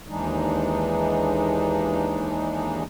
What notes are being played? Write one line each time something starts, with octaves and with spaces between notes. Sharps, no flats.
D#2 E3 G#3 D4 D#4